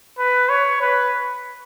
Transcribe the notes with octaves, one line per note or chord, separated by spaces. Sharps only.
B4
C#5
B4